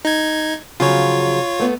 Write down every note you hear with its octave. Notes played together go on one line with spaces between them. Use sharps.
D#4 G#6
C#3 F3 F#3 F4 C#5
A3 B3